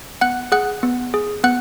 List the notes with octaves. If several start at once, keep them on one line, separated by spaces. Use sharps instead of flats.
B3 F#5 F#6
G#4 F#5 F#6
B3
G#4
B3 F#5 F#6